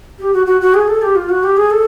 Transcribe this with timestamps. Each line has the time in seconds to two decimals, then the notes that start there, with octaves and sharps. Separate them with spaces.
0.19 G4
0.33 F#4
0.46 F#4
0.61 F#4
0.74 G#4
0.87 A4
1.02 G4
1.15 F4
1.29 F#4
1.43 G4
1.57 G#4
1.71 A4